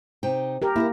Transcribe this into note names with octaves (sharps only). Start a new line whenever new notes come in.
C3 D#4 G5
G4 A#4
A#3 E4 G#4 A#4